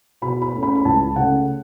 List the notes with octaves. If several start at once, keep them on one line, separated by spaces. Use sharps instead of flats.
B2 B5
B5
A3
C#4
B5
B5
C#2 A5
C#3 A3 F#5